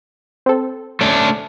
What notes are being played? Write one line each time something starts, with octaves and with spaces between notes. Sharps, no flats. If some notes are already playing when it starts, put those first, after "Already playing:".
C4 A4
A3 C#4 D4